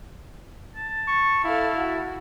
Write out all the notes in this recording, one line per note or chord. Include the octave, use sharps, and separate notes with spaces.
A5
C#6
E4 A4 F5
F#4